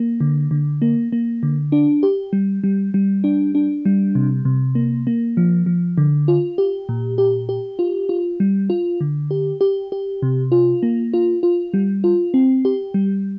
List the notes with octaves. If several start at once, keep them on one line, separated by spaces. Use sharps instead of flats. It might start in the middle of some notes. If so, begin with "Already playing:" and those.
Already playing: A#3
D3
D3
A#3
A#3
D3
D4
G4
G3
G3
G3
D4
D4
G3
C3
C3
A#3
A#3
F3
F3
D3
F4
G4
A#2
G4
G4
F4
F4
G3
F4
D3
G4
G4
G4
C3
F4
A#3
F4
F4
G3
F4
C4
G4
G3